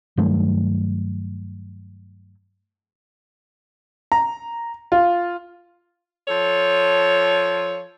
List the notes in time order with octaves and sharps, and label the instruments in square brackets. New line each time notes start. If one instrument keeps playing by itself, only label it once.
[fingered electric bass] G2 D#3 F#3 A3
[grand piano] A#5
F4
[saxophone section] F3 A4 C#5